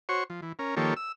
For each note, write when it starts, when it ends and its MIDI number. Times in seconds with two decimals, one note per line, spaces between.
0.09 0.24 66
0.09 0.24 72
0.09 0.24 73
0.09 0.24 85
0.30 0.41 53
0.42 0.52 52
0.59 0.75 61
0.59 0.75 70
0.77 0.94 51
0.77 0.94 53
0.77 0.94 58
0.77 0.94 67
0.77 0.94 69
0.77 0.94 73
0.96 1.12 88